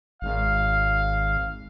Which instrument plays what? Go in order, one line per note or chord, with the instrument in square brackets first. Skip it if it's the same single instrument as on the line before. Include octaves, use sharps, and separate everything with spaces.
[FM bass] G#1 [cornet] F5